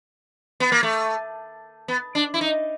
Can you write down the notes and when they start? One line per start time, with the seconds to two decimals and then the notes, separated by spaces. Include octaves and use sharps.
0.60 B3
0.72 A#3
0.83 A3
1.88 B3
2.15 D4
2.34 E4
2.41 D#4